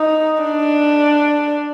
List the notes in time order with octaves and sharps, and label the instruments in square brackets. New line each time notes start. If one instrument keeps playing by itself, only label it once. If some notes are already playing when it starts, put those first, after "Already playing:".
Already playing: [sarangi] D#4
D4